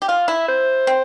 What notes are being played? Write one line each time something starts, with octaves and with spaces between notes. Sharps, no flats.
G4
F4 F5
E4 E5
C5
C4